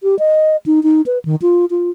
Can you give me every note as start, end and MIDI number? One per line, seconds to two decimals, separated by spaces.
0.03 0.18 67
0.19 0.56 75
0.66 0.83 63
0.83 1.01 63
1.06 1.19 71
1.25 1.36 51
1.42 1.65 65
1.70 1.90 65